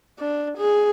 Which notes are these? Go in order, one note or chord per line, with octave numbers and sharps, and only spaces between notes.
D4
G#4